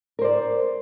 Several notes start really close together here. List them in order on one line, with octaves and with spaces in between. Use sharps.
A#4 C5 D5